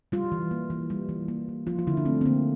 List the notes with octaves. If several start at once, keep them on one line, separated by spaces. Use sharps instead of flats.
G3 F4
E3
A#3
E3
G3
E3
A#3
E3
F3 F4
F4
D3 E4
D4
A3 C4
C4
D3 A#3